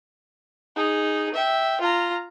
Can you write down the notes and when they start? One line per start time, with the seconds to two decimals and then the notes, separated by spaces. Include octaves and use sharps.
0.76 D#4 G#4
1.34 E5 G5
1.81 F4 A#5